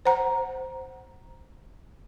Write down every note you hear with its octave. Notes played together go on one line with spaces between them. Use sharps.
C5 F#5 A#5